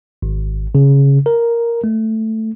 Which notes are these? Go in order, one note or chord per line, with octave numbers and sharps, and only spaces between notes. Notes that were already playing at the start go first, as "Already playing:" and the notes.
G#1
C#3
A#4
A3